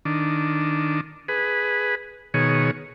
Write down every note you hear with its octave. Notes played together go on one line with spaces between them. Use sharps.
D#3 D4
G#4 B4
B2 D#3 G#4 C#5